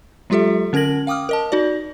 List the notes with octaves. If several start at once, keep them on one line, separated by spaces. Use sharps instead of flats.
F#3 G#3 F4 G4 A4 E5
D3 C#4 A#4 G#6 A#6 F#7
F5 G5 D6 D#6 F6
A#4 D#5 A5
D#4 F#4 D5